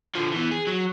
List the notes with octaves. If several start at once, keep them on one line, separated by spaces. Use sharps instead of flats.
D3 F3
E3 B3
G#4
F#3